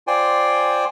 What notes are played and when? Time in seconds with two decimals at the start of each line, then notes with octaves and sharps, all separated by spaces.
0.07 F4 C5 D5 G5 G#5